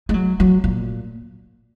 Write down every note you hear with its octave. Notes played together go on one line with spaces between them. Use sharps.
G#3
F#3
F#3
A#2